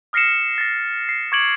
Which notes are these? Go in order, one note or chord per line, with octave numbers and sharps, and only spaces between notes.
D#6 F6 A#6 C7 C#7 E7
A6 A#6
C7
C#6 D6 G#6 C#7 D7 F#7